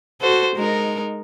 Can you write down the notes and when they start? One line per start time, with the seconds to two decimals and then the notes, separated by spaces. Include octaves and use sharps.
0.21 F#4 A4 C5
0.56 G#3 D#4 A#4